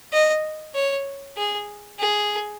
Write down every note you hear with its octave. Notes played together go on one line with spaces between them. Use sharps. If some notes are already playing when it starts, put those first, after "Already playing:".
D#5
C#5
G#4
G#4